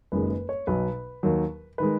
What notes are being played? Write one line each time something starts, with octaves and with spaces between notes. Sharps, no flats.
F#1 F#2 D#3 G#3 B4
B4
C#5
B1 B2 F#3 B4
D#2 D#3 F#3
D#3 G#3 B4